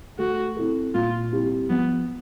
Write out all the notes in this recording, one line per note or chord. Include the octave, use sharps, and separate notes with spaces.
A3 F#4
C4 E4 A4
A#2 F4
G3 C4 E4 G4
F3 B3